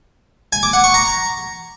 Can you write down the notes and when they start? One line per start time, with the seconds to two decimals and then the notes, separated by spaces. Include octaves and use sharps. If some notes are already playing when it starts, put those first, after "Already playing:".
0.53 G#5
0.63 D6
0.73 F#5
0.84 C#6
0.94 A#5